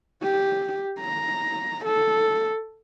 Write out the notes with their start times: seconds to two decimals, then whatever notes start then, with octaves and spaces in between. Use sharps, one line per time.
0.23 G4
1.00 A#5
1.85 A4